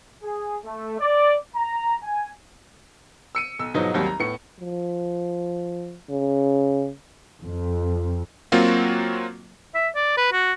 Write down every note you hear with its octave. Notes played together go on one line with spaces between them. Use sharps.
G#4
A3
D5
A#5
G#5
E6 C#7 D#7
B1 E6
G#2 B2 F3 F#3 B3 D#4
G#1 D#2 F#3 G3
A#5
A2 B3 C#7
F3
C#3
F2
F#3 A#3 C4 F4 F#4
E5
D5
B4
F#4